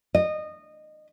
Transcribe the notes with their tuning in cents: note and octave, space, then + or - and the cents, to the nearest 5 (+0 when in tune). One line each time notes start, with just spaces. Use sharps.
D#5 -20